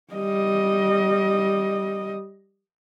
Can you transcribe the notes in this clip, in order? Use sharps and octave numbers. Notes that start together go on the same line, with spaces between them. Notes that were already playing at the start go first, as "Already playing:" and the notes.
G3 D#5